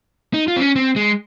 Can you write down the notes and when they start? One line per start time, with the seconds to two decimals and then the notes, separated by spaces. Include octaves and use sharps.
0.34 D#4
0.48 F4
0.56 C4
0.61 C#4
0.76 C4
0.96 G#3